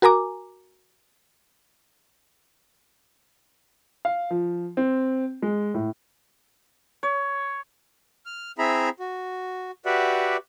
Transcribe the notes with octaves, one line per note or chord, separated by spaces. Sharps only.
F#4 A#4 G#5 A#5 D6
F5
F3
C4
G#3
A2
C#5
F6
C4 E4 G#4 E5 A#5 B5
F#4
F#4 G4 B4 D5 E5 F#5